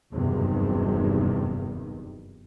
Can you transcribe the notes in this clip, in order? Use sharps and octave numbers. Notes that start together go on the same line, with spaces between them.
F#1 E2 G2 C3 D#3